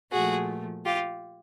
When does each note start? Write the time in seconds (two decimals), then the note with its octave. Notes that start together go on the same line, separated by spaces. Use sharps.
0.11 A#2 F3 A3 F#4 G#4
0.85 F4 G4